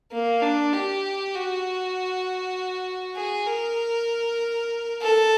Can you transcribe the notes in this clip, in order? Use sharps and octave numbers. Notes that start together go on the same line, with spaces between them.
A#3
D4
G4
F#4
G#4
A#4
A4